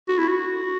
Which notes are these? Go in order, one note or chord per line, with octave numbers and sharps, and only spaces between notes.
F#4
E4
F#4